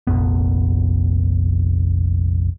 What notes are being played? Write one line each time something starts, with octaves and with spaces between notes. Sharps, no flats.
F1 A#1 F2 B3